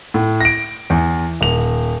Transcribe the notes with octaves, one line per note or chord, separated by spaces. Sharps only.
A2
A#6 D7
E2
D#1 F7